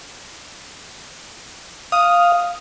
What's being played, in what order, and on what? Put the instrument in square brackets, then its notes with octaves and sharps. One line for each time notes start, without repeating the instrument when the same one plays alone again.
[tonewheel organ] F5 [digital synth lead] D#6